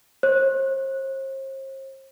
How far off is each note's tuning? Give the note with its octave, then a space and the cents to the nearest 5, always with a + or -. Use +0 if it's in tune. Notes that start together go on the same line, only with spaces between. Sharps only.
C5 +40